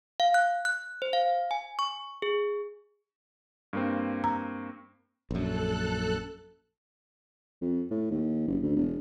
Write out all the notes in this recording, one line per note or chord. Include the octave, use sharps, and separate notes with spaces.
F5
F#6
F#6
C5
F5
G#5
C#6
G#4
G2 A#3 C4
A#5
A#1 F#2 A4 F#6
F2
A2
D#2
F#1
D2
E1